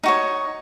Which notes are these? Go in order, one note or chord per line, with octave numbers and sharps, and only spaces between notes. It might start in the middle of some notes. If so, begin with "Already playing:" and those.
D#4 F#4 C#5